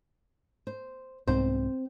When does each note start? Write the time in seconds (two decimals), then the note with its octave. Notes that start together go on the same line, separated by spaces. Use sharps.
0.67 C5
1.27 C2 G#2 C4 C5